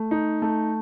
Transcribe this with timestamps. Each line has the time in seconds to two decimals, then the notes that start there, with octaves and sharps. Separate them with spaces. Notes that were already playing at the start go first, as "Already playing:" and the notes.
Already playing: A3
0.11 D#4
0.42 A3